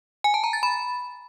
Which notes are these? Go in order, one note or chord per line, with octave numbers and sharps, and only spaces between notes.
G#5
A5
A#5
A6
B5